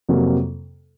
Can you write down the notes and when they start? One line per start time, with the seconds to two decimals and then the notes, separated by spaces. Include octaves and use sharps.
0.09 F2 C3 F#3 A#3